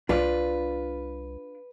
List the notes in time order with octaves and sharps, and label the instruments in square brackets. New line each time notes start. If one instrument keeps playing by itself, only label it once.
[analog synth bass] C2 [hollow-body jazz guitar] D4 F4 D5 [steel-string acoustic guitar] B4